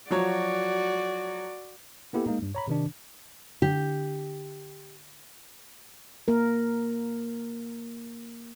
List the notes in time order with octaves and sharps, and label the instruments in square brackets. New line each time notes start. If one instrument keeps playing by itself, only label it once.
[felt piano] F3 F#3 C#5 [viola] F#4 D5
[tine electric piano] A#3 B3 E4 G4 A4
G#3 A#3 D#4
G2
C#5 A#5 B5
C3 D#3 D4
[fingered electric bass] D3 [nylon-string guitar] G4
[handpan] A#3 A#4